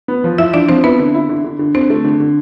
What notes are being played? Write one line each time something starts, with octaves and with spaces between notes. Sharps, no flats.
B3
F3
F3 E4 E5
F3 D4 D5
F3 C4 C5
B3 E4 B4
D3
E4
D3
D3
D3
D3 C4 C5
A3
D3
D3